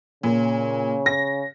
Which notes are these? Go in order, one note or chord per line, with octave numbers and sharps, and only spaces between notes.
A#2 C#3
A#6